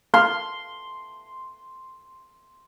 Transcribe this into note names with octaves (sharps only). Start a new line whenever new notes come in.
F5 C6